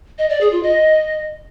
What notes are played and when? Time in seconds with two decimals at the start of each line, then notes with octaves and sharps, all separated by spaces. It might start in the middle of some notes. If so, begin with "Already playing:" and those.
0.18 D#5
0.29 D5
0.40 G#4
0.52 F4
0.63 D#5